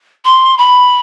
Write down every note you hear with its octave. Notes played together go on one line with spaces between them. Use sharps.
C6
B5